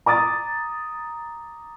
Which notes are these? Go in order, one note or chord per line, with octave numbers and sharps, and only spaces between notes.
A#5 D6 D#6 A6